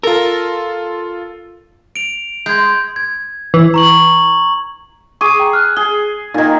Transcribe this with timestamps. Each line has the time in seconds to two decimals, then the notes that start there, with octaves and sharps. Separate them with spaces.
0.03 F4 A4 A#4
1.96 D7 F7
2.46 G#3 G6 G#6
2.96 G#6
3.54 E3
3.74 A#5 C#6 F#7
5.21 G#4 C#6 D6 D#7
5.40 G5 A#5
5.53 F6 F#6
5.77 G#4 G7
6.34 A#2 D#3 D#4 G#6